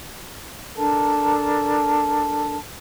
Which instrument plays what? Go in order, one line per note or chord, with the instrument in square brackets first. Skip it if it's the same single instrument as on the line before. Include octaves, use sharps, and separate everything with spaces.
[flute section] D4 A4 A#4 A5